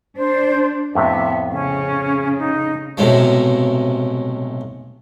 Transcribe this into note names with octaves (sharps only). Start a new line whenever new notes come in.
D4 C5
F2 A2 C3 B3 E5
C#3 C#4
D#4
B1 A2 C3 G#3